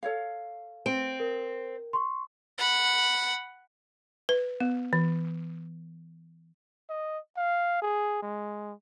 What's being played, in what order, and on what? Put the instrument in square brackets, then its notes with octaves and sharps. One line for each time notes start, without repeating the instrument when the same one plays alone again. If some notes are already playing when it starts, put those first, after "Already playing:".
[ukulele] A4 C#5 F5
[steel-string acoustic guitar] C4 [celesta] D7
[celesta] A#4
C6 C#6
[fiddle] F#5 B5
[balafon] B4
B3
E3
[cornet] D#5
F5
G#4
G#3